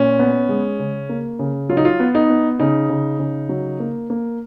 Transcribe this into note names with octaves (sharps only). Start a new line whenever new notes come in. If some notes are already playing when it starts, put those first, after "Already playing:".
Already playing: A#2 C#4
B3
G#3
C#3
A#3
C#3
F#3 F4
D#4
F4
B3
D#4
B3
C#3 D#4
C#3
C#3
F#3
A#3
A#3